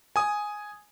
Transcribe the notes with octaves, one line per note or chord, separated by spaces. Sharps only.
G#5 D#6